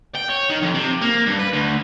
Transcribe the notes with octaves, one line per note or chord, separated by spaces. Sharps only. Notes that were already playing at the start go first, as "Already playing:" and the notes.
G5
C#5
D#3
F2
C3
A#3
G2
B4
D2